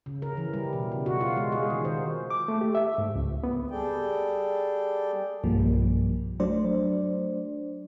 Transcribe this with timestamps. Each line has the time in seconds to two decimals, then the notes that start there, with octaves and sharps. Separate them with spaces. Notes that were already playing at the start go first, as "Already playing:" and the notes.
0.06 C#3
0.22 A#4
0.37 E3
0.54 G3
0.73 B2
0.92 C#3
1.06 F#4
1.21 F4
1.37 G#3
1.52 G#4
1.70 D#3
1.85 C5
2.30 D6
2.48 A3
2.61 G4
2.75 E5
2.98 G#2
3.15 C#2
3.44 B3
3.71 G3 G#4 A4 D5 G5
5.44 B1 G2 F3 G3 A#3
6.40 F#3 A3 D4 C5 D5